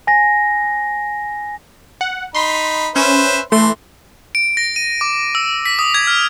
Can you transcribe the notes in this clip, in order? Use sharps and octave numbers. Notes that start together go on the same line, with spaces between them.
G#5 A#6
F#5
D#4 B5 C6
C#4 B4 C5 E5
E3 A3 C6
D7
A#6
D#7
D6
E6
B6
D#6
G#6
F6